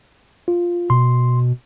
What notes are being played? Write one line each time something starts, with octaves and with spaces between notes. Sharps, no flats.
F4
B2 C6